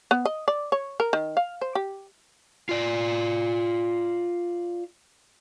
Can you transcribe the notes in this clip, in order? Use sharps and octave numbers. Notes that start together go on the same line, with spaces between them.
B3
D#5
D5
C#5
A#4
D#3
F5
C5
G4
F4 D5